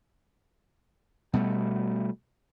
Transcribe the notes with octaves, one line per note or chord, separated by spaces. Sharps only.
B2 G3 A3